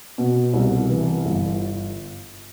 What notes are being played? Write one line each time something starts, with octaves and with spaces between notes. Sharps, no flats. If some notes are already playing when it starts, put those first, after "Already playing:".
B2
C2
E3
G1